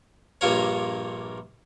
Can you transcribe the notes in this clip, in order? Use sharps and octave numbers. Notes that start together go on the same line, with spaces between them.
A#1 G2 A#2 A#3 A#4 C#5